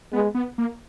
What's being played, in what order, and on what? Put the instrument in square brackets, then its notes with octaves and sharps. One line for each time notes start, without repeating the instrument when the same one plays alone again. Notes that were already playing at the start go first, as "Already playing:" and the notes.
[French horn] G#3 [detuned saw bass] B3
[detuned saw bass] B3
A#3